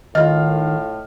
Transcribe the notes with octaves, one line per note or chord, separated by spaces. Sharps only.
A2 D#3 F4 D#5 F6